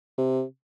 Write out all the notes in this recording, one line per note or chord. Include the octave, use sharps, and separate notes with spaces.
C3